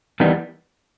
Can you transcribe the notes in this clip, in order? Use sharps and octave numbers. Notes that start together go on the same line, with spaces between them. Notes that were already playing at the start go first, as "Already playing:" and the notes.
E2 D#3 G3 B3